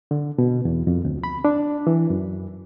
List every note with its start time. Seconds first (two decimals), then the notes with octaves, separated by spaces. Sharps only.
0.11 D3
0.38 B2
0.65 E2
0.87 F2
1.05 D2
1.24 B5
1.45 D4
1.87 E3
2.10 F#2